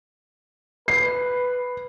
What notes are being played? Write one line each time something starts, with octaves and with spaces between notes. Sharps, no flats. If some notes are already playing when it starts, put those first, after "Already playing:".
B4 C7